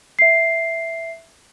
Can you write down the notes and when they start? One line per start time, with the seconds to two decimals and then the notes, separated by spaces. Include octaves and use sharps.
0.19 E5 C7